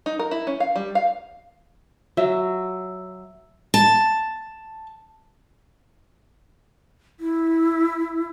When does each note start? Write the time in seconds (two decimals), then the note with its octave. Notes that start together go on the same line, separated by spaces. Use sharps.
0.06 D#4
0.19 A#4
0.31 E4
0.47 C#4
0.60 F5
0.76 G3
0.95 F5
2.17 F#3 E5
3.74 A5
7.20 E4